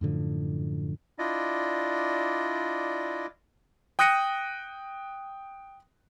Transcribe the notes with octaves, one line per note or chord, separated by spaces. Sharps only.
F#2 A2 D3 F3
D4 E4 F4 D5 D#5
G5 D#6 F#6 A#6 C#7 D#7